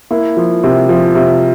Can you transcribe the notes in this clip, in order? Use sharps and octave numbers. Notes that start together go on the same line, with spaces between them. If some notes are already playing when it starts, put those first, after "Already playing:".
A#3 E4
F3
C3
F3
C3